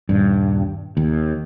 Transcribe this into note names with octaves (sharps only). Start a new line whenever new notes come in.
D#1 G2
D#2